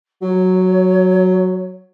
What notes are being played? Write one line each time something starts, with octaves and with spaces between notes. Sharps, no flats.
F#3 C#5